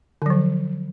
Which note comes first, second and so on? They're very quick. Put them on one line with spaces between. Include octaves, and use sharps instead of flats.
D3 F#3 F3